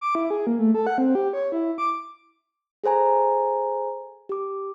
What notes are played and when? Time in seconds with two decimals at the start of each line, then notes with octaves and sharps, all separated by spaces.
0.01 D6
0.15 E4
0.30 G#4
0.47 A#3
0.59 A3
0.74 A4
0.87 F#5
0.98 C4
1.15 G4
1.33 C#5
1.52 E4
1.78 D6
2.84 G#4 A4 C5 G#5 A#5
4.29 G4 D6